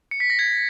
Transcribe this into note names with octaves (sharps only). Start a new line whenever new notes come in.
C#7
B6
A#6
G#6